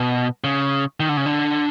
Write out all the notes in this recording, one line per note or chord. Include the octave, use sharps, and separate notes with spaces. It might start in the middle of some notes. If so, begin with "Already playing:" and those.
Already playing: B2
C#3
D#3
D3
C#3
D3